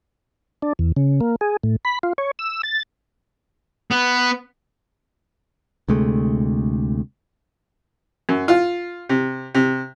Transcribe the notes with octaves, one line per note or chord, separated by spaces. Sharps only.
D4
E2
C#3
A#3
G#4
A2
B5
F4
C#5
E6
A6
B3
D2 C3 G#3 A3
F#2
F4
C3
C3